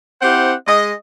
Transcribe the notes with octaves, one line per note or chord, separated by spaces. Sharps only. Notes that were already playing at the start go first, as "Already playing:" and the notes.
C4 E4 G4 C5 F#5
G#3 D#5